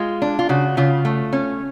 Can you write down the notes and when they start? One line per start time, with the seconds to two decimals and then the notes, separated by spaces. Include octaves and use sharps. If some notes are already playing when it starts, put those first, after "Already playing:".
Already playing: G#3 F4
0.22 D4
0.39 F4
0.49 C#3 F#4
0.77 C#3 F4
1.05 A3
1.33 C#4